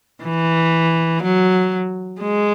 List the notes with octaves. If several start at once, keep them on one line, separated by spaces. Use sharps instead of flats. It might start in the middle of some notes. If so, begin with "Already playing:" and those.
E3
F#3
G#3